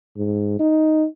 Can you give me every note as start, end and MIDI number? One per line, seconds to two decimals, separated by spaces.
0.17 0.58 44
0.60 1.06 63